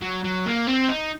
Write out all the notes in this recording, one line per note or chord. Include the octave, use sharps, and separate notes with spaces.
F#3
F#3
A#3
C4
D#4